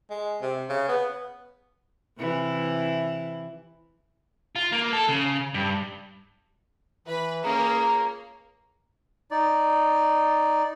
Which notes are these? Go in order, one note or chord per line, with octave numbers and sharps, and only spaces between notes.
G#3
C3
C#3
B3
C3 E3 E4
F4
A#3
A4
C#3
G2
E3 B4 B5
C#2 A#3 C#4 G#4 A#5
D#4 D5